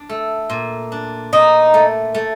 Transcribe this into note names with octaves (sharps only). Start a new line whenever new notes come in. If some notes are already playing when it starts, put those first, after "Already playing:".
Already playing: D4
A3
A#2
D4
A#2 D#4
A3
A3